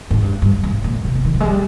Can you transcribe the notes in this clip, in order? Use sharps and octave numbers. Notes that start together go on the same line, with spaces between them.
G#2
G2
G2
G#2
A#2
C3
C3
D#3
F3
G#3
G3